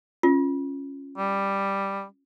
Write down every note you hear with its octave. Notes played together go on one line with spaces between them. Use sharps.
C#4 F4
G3